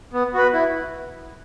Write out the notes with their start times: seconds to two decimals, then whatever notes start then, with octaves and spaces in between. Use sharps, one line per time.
0.13 B3
0.34 F#4 B4
0.53 E4